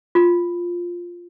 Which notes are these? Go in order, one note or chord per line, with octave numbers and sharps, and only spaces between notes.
F4